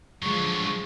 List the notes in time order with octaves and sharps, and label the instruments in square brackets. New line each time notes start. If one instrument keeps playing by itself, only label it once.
[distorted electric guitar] D3 F#3 [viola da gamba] F3 G#3 [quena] C#6